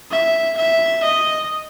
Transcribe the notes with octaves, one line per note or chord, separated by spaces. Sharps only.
E5
E5
D#5